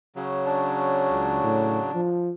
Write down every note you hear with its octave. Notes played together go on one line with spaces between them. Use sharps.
C#3 F#3
D4
C#2
A2
F3